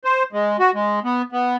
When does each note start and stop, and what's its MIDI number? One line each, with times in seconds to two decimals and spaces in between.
0.04 0.23 72
0.33 0.57 56
0.60 0.71 66
0.74 1.00 56
1.05 1.22 59
1.32 1.56 59